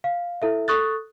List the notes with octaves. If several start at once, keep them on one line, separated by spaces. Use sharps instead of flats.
F5
E4 A4 E5
A4 C#6 D#6 F#6 A6